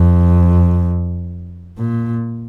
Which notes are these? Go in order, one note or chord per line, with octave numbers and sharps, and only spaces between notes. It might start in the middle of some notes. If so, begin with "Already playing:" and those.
Already playing: F2
A#2